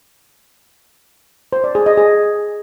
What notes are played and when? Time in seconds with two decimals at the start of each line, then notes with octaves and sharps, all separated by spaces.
1.53 C5
1.64 D5
1.75 G#4
1.86 D#5
1.98 G#4